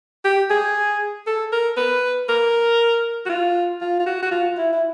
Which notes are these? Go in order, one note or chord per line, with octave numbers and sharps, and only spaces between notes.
G4
G#4
A4
A#4
B4
A#4
F#4
F4
F4
F4
F#4
F#4
F4
E4
E4